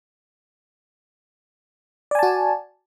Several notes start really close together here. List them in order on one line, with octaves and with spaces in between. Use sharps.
D5 G#5 A5 F#4